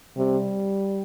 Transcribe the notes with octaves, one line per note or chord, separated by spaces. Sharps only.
C3 G3